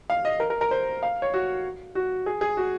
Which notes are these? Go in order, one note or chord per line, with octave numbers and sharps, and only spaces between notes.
F5
D#5
A#4
A#4
A#4
C5
F5
C#5
F#4
F#4
G#4
G#4
F#4